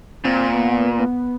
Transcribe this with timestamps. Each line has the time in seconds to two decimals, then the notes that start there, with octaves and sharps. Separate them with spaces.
0.25 A#2 C4
0.54 B3
0.99 B3